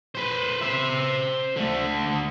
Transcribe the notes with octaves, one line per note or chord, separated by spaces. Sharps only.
B4 C5
C5 E5
D3 A3